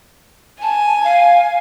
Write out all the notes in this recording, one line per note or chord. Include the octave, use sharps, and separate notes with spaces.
G#5 A5
F5